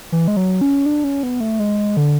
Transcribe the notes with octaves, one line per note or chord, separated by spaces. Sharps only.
E3
G#3
F#3
C#4
D4
C#4
B3
A3
G#3
D3